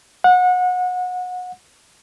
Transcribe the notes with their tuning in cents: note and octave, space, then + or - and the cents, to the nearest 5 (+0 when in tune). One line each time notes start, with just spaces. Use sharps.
F#5 -30